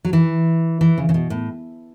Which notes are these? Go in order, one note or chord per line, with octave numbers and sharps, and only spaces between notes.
F#3
E3
E3
C#3
C#3
B2
A2